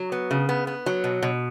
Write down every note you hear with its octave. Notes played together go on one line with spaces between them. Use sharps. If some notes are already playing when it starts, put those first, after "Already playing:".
Already playing: F#3
B3
C#3
B3
B3
F#3
B2
B2